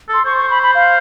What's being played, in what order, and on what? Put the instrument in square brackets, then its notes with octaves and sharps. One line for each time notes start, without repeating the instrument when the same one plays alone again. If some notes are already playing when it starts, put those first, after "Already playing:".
[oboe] A4 [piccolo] C6
[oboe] C5 [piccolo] C#6
[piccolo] C#6
B5
B5
F5